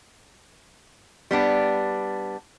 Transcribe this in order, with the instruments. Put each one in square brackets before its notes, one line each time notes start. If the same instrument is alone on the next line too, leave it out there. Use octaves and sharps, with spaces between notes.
[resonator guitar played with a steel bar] G3 B3 D4